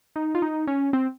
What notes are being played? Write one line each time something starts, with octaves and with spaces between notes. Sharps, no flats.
D#4
F4
D#4
C#4
C4